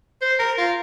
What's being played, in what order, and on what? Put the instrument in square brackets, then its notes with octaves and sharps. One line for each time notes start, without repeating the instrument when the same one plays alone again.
[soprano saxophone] C5
A#4
F4